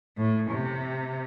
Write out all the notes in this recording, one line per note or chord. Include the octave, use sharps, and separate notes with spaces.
A2
C3